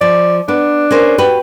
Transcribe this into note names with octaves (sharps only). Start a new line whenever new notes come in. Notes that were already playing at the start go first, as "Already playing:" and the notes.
F3 D5
B3 D4
C#4 A#4 C5
F#4 G4 B4